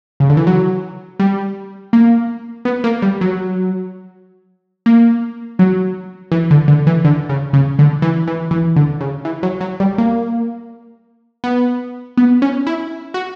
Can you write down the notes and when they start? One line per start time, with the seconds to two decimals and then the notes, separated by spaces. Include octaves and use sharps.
0.20 C#3
0.30 D3
0.37 E3
0.47 F#3
1.20 G3
1.93 A#3
2.65 B3
2.84 A#3
3.02 G3
3.21 F#3
4.86 A#3
5.59 F#3
6.32 E3
6.51 D3
6.68 D3
6.87 E3
7.05 D3
7.29 C#3
7.53 C#3
7.79 D3
8.02 E3
8.27 E3
8.51 E3
8.76 D3
9.01 C#3
9.25 E3
9.43 F#3
9.61 F#3
9.80 G3
9.98 A#3
11.44 B3
12.17 B3
12.42 C#4
12.67 E4
13.14 F#4